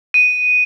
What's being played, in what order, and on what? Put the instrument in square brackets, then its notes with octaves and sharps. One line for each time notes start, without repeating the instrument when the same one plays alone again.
[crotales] D#7